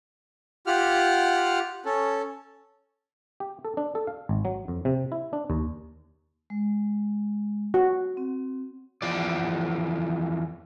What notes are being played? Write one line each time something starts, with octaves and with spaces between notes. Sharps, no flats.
F4 G4 F#5 F6
C#4 A4
G4
A4
D4
A4
F5
G#1
F#3
F2
C3
E4
D4
D#2
G#3
F#4
C4
E2 F3 D5